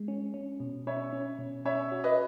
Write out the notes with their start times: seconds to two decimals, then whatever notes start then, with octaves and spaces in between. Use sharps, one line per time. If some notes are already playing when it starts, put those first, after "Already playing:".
Already playing: G#3
0.08 C#4
0.34 C#4
0.60 B2
0.87 C#4 C#5 E5
1.13 C#4
1.39 B2
1.65 C#4 C#5 E5
1.92 F#4
2.04 B4 D#5